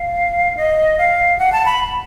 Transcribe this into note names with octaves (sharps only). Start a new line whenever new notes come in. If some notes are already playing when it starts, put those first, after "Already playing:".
Already playing: F5
D#5
F5
F#5
A5
B5